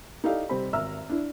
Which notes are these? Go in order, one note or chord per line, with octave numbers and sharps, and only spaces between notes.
D#4 E4 G4 A4 D5 F5
C3 G3 C4 B5
G#1 E5 A#5 E6 F6
D4 E4